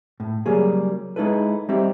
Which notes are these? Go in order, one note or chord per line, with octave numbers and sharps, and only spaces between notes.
A2
C#3 F#3 G3 A#3 G#4
G#3 D#4 E4 A4 B4
G3 C4 D#4 G4 E5